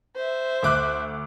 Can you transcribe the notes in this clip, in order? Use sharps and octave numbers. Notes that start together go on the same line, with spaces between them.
C5 E5
D2 D6 F#6